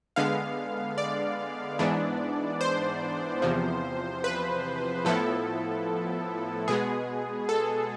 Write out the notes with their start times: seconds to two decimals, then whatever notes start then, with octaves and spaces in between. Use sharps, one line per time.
0.16 D3 G#3 B3 F5
0.98 D5
1.79 G#2 E3 B3 D4
2.61 C5
3.42 E2 C3 F3
4.24 B4
5.05 A2 F3 B3 E4 A4
6.68 B2 G#3 B3 G#4
7.49 A4